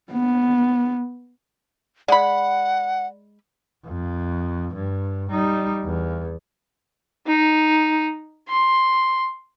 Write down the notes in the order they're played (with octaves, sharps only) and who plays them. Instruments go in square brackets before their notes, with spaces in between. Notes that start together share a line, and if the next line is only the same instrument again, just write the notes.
[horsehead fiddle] B3
[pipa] G#3 B5 [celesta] D5 [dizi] F#5
[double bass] F2
G2
G3 D#4
E2
[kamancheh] D#4
C6